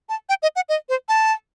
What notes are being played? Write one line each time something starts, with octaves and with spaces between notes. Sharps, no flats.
A5
G5
D#5
F#5
D#5
C5
A5